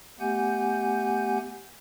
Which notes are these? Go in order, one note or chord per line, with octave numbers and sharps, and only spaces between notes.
A3 B3 G4 F#5 G#5 G6